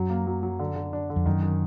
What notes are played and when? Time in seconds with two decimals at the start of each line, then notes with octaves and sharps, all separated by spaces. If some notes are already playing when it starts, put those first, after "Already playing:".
Already playing: F#2 F#3
0.10 A#3
0.27 F#3
0.43 F#3
0.59 D3
0.76 D3
0.93 D4
1.10 D3
1.16 F2
1.26 F#2 D#3
1.42 D#3